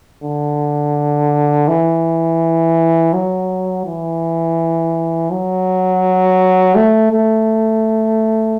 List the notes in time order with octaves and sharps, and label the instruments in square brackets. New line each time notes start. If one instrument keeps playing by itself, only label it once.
[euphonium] D3
E3
F#3
E3
F#3
A3
A3